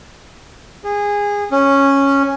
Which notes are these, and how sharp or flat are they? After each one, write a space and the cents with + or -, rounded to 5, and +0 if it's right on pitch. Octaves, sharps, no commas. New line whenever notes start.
G#4 -20
C#4 -5